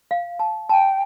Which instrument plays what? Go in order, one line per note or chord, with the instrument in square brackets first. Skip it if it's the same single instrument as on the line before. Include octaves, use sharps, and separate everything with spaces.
[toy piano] F5
A5
[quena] G5 [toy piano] A5